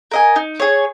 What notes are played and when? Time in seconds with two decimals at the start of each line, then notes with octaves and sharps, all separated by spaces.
0.11 A#4 D#5 G#5
0.36 D#4
0.60 G#4 C#5